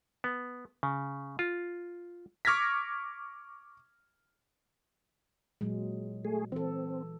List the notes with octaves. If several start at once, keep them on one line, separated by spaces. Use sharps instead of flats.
B3
C#3
F4
C#6 D6 F6 G#6 A#6 B6
A#2 F#3 G#3
A3 G#4
E3 C4 A4